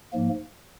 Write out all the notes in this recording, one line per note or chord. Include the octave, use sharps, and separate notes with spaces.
G#2 F3 A#3